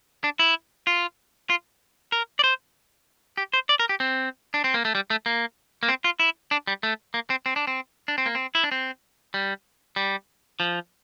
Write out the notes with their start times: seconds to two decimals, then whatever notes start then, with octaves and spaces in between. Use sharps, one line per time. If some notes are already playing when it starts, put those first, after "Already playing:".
0.24 D4
0.39 E4
0.87 F4
1.50 F4
2.12 A#4
2.39 D5
2.44 C5
3.37 G4
3.53 C5
3.69 D5
3.80 A#4
3.89 G4
4.00 C4
4.54 D4
4.64 C4
4.74 A#3
4.85 A3
4.95 G3
5.10 A3
5.26 A#3
5.83 A#3
5.88 C4
6.04 F4
6.20 E4
6.51 D4
6.67 G3
6.83 A3
7.14 A#3
7.30 C4
7.46 C4
7.56 D4
7.67 C4
8.08 D4
8.18 C4
8.26 A#3
8.35 C4
8.55 E4
8.64 D4
8.72 C4
9.34 G3
9.96 G3
10.60 F3